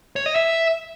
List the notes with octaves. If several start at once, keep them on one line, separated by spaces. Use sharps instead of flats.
C#5
D#5
E5